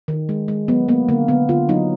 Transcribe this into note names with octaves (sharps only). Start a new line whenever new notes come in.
D#3
G#3
G#3
F#3 B3
A#3 B3
D3 A#3
D3 B3
D3 F4
F#3 D#4